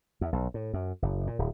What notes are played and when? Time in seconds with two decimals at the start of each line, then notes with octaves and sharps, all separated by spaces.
0.21 E2
0.33 B1
0.54 A2
0.74 F#2
1.02 F#1
1.27 A#2
1.39 D1